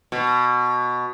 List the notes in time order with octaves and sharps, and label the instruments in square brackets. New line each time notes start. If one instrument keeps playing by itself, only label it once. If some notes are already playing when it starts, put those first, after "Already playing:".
[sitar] B2